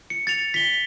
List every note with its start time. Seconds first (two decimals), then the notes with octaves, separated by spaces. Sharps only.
0.10 C#7
0.27 A6 C#7 F7
0.54 B6 G7